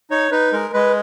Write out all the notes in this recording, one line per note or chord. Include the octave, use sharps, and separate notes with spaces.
D#4 C#5
D#4 B4
G#3 A#4
G#3 B4